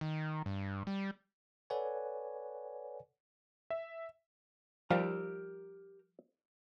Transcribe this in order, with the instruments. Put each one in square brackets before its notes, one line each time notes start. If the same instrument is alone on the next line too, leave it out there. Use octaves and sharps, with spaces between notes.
[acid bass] D#3
G2
G3
[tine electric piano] A4 B4 C#5 D5 F#5 G#5
[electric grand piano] E5
[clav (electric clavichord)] F3 G3 F5 [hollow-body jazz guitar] G4 A#4 A#5